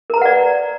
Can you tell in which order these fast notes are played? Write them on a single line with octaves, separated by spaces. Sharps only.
A#4 A#5 B4 F#5 D5